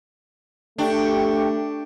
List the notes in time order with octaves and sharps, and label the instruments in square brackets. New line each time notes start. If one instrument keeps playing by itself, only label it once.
[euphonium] A3 [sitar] D4 [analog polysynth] G4 G5 C#6